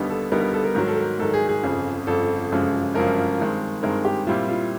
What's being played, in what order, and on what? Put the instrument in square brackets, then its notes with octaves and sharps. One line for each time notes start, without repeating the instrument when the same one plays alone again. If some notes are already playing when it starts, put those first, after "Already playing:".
Already playing: [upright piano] D#2 D3 G3 B3 D#4
[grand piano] A4
[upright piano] D#2 D3 G3 B3 D#4 [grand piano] A#4
[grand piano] A#4
A4
A#4
[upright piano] G#2 D#3 F#3 [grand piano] A#4
[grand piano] A4
A#4
[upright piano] G#2 D#3 F#3 [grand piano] A4
[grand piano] G#4
G#4
[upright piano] G1 F2 C#3
[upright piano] G1 F2 C#3 [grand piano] A4
[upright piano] G1 F#2 C#3 F3 G#3
[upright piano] G1 F#2 C#3 F3 G#3 [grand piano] A#4
[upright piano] G2 D#3 G#3 C4
[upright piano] G2 D#3 G#3 C4 [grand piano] A#4
[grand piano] G4
[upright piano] A#2 G3 C4 E4 [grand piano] F4
[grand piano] F4